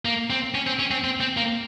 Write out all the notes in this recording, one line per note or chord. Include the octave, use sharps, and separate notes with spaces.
A#3
C4
C#4
C4
C#4
C4
C4
C4
A#3